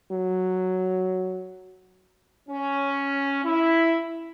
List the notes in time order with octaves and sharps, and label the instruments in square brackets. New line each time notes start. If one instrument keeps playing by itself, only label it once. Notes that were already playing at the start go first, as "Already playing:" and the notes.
[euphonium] F#3
[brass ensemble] C#4
E4